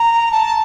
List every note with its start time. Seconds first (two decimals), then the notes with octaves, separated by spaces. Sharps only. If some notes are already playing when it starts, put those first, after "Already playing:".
Already playing: A#5
0.31 A5